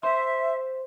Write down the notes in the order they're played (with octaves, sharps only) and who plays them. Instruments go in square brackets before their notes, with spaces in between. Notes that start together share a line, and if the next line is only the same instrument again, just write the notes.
[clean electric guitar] C5 C6 [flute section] E5